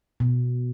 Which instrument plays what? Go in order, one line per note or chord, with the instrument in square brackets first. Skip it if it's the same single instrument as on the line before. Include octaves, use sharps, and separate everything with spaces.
[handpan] B2